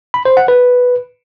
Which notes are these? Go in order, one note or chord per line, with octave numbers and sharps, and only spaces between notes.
B5
C5
F#5
B4